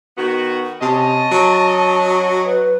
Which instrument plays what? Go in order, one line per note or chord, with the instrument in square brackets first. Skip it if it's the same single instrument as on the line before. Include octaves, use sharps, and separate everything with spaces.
[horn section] D#3 B3 F#4
[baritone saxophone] C3 [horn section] C#4 C#5 D#5 [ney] A5
[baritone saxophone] F#3
[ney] B4